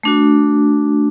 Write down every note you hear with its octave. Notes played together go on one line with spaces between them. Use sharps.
A3 D4 F#4